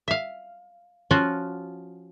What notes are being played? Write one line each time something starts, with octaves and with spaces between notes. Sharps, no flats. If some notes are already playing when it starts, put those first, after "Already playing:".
E5 F5
F3 C#4 F4 F#4